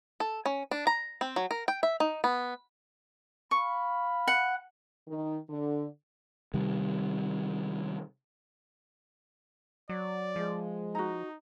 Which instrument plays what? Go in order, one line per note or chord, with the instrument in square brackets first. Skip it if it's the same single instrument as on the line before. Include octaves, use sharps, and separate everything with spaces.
[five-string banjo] A4
C#4
D4
A#5
C4
F#3
A#4
G5
E5
D#4
B3
[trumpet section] F5 B5 [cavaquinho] C#6
[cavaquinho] F#5
[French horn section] D#3
D3
[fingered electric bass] C3 D#3 G3
[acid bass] F#3 [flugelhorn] D5
[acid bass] F3 [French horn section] G#3
[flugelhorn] D#4 [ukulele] F#4 A#5